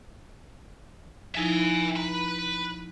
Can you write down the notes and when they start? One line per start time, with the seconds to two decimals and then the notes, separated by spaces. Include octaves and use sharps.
1.35 F3 D#4 E4 E5 G#5
1.96 B4 A#5 B5